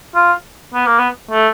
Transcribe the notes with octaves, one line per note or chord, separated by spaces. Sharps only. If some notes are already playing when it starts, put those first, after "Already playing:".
F4
B3
A#3
B3
A3